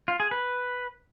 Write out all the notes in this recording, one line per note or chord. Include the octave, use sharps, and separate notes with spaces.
F4
G#4
B4